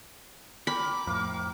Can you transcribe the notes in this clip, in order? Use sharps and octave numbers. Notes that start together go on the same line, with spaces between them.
A#4 G5 B5 D6
F2 A2 A#4 F5